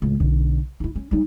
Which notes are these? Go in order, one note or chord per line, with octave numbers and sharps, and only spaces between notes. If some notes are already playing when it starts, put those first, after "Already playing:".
C#2 A2
B1 D3
D#4 E4
C#4
G3 D#4